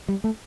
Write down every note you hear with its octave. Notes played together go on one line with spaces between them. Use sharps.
G3
A3